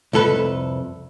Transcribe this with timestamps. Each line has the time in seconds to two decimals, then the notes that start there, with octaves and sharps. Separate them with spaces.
0.13 C2 F2 A4 B4